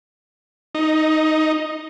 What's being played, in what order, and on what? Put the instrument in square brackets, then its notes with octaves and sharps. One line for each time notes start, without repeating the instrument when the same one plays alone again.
[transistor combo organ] D#4